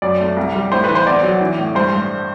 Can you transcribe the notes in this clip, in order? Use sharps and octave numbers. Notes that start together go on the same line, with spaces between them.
F#2 D5
A3
C2
G3
A2 C5
B4
E3
C5
E2 D5
F#3
E3
A2
G2 C5
G2